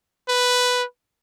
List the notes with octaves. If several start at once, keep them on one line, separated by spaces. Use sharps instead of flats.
B4